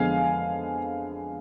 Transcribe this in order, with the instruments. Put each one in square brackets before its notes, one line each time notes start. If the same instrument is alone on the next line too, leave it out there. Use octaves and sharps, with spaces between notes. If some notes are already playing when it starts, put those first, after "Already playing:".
Already playing: [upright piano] F2 D3 G#3 B3 F5 G#5